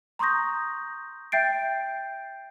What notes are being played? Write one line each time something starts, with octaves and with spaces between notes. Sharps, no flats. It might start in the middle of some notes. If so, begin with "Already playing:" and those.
A#5 C6 C#6 D#6 G6 A#6
E5 G5 G6 A6 C7 D7